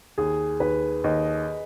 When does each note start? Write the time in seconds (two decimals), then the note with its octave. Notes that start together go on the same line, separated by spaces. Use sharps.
0.18 D#2 G#4
0.60 D#2 B4
1.04 D#2 D#5